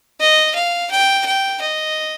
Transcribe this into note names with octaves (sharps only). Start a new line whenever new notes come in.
D#5
F5
G5
G5
D#5